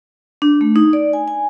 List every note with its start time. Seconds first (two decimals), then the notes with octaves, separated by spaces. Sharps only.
0.42 D4
0.61 A3
0.76 D#4
0.93 D5
1.13 G#5
1.28 G#5